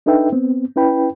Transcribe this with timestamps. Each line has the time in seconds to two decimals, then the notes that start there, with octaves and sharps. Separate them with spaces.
0.06 D4 D#4 A4 B4 E5 G5
0.32 B3 C4
0.76 C#4 E4 B4 G5 B5